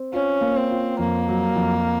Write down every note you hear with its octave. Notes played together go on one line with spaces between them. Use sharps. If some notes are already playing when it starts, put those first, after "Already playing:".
Already playing: C4
C#4 F4
A#3
C4
F4
F2 A#3
F#3
F2